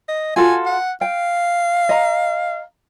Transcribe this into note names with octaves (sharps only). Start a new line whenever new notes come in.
D#5
F4 F#4 A4 G#5
F#5
F5 G5
D#5 A#5